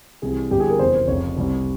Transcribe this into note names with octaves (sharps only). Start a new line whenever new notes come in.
C2 C3 E3 G3 G#4
G1 G2 E3 G3 G4
G#4
A#4
F1 E2 C#3 E3 C5
F1 F2 C#3 C#5
C2 C3 G3